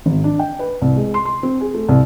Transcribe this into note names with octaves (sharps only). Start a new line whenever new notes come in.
G#1
D4
G5
B4
C2
G#3
C6
C6
C4
G#4
A3
C2